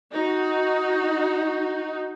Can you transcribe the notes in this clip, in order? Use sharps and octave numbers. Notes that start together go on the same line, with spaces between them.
D#4 F#4